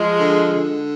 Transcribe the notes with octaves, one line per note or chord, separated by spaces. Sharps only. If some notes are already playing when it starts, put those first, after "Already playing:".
Already playing: F3 G#3
D3
D3